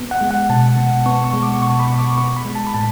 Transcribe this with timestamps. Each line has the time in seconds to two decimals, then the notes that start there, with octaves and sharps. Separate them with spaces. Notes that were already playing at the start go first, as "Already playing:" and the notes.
Already playing: B3
0.11 F#5
0.21 G#3
0.31 F#5
0.50 B2 A5
0.77 B2
1.06 B3 C#6
1.24 C#6
1.33 G#3
1.43 D6
1.62 B2 C#6
1.80 B5
1.90 B2
1.99 D6
2.18 B3 C#6
2.36 B5
2.45 G#3
2.55 A5
2.67 B5
2.74 A2 A5